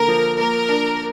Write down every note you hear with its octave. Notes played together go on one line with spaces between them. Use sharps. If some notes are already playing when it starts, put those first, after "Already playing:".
Already playing: D3 A#3 A#4
F3
A#3 A#4
D4